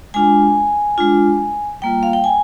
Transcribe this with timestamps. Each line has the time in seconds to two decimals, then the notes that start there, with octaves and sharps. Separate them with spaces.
0.14 G#3 D4 F4 G#5
0.98 G#3 D4 F4
1.82 G3 A#3 F4 G5
2.03 F5
2.13 G5
2.24 G#5